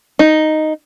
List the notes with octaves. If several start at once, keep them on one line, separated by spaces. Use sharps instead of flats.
D#4